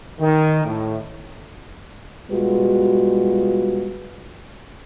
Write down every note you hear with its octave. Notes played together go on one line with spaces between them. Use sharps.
D#3
A2
B2 G3 G#3 F4 F#4 B4